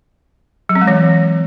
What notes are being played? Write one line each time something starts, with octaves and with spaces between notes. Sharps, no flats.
F#3
C4
G#3
E3